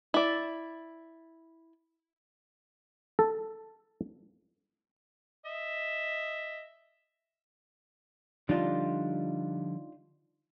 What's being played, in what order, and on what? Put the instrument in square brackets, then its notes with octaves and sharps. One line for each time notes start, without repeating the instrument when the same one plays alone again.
[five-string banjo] E4 D5
[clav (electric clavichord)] A4
[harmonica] D#5 E5
[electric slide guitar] D3 F3 G3 [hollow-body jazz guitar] D4 D#4 F4